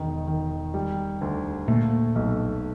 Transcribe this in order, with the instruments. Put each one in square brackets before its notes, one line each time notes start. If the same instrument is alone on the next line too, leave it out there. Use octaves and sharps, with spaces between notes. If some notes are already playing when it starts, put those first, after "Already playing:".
Already playing: [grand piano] E1 D#3
D#3
G3
D2
[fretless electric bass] A#2 [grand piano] A3
[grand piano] B1